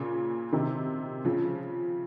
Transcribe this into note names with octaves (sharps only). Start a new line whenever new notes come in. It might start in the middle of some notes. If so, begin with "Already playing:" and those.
Already playing: A#2 C#3
C3 D#3
C#3 F3